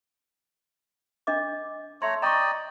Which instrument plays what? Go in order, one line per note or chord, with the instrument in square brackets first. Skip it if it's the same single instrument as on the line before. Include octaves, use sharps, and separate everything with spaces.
[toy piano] D4 D#5 D6
[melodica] A3 C#5 A#5 [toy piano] C6
[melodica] D5 D#5 G5 [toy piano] A#5 C#6